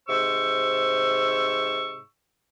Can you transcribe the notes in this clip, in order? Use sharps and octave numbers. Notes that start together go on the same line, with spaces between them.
G#2 C3 C5 C#6 E6